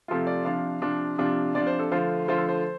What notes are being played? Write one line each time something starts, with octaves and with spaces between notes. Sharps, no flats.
C3 F3 A3 F4
D5
C3 F3 D4 F5
C3 F3 D4
C3 F3 D4 F4
C3 F3 D4 F4 D5
C5
A4
D3 F3 A3 F4 C5
D3 F3 A3 F4 C5
A4
C5